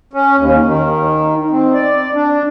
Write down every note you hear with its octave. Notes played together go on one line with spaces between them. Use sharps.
C#4
D#2
D#3
C4
D5
D4